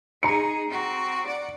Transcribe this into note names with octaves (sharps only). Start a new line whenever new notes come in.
D#4 G#4 A#5 C#7
C4 F#4
D5 F#5